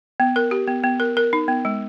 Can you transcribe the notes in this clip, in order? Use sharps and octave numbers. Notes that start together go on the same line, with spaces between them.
B3
A#4
G4
B3
B3
A#4
A#4
D#4
B3
G#3